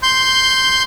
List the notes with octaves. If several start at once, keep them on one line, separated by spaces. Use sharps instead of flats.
C6 G6